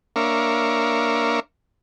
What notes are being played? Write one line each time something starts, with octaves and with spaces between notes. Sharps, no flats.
A#3 D4 A#4 C#5 E5 F5